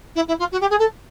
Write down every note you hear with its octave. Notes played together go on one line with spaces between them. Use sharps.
E4
E4
F4
F#4
G4
G#4
A4